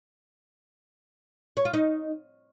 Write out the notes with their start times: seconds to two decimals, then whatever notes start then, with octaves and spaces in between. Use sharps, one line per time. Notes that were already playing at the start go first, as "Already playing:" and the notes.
1.57 C#5
1.65 F4
1.74 D#4